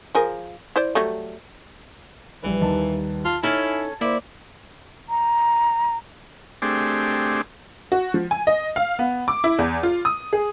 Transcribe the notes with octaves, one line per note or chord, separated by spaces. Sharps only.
F3 G#4 A#4
E4 C5 D5
F#3 G3 A3
A#1 E3 G3 B4
D#2 D#3 A5
F4 A5
C#4 D#4 E4 A4
A#3 E4 C5 D5
A#5
A3 C4 D4 G4 G#4
F#4
F3
G#5
D#5
F5
B3
D6
E4
E2
F4
D#6
G#4